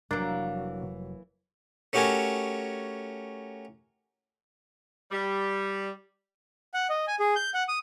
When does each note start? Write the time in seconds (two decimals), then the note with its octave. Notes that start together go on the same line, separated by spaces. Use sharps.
0.11 F1 E3 F#3 G3 A#3 D4
1.93 A3 C#4 F#4 G4 A#4 G#5
5.11 G3
6.74 F#5
6.90 D#5
7.07 G#5
7.20 G#4
7.36 G6
7.54 F#5
7.68 D#6